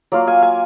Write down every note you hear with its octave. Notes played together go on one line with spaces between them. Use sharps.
F#3 A#3 F4 D5 F5
F5 G#5
F5 G#5